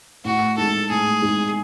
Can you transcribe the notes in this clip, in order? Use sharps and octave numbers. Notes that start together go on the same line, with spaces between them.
A2 F#4
G#3 D#4 A4
A2 G#4
G#3 D#4